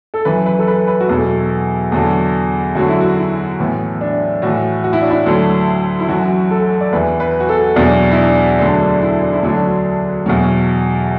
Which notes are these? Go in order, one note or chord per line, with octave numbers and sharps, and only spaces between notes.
A4
F#2 E3 B4
B4
A4
B4
B4
F#4
E2 B2 F#3 A4
E2 D3 F#3
F#2 D3 F#3 F#4
E4
F#4
E4
A2 E3 B3
D4
A2 E3 F#4
F#4
E4
D4
E4
D2 D3 F#3
E4
F#2 E3 F#4
A4
D5
E2 E3 B4
B4
F#4
A4
E2 B2 F#3 D4
E4
D4
D2 D3 F#3 D4
D4
E4
D4
E4
D2 D3 F#3 D4
E2 B2 F#3